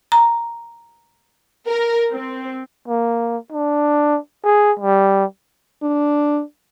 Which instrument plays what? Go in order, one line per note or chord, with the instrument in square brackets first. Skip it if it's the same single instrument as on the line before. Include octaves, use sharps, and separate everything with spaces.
[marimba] A#5
[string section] A#4
C4
[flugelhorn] A#3
D4
G#4
G3
[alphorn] D4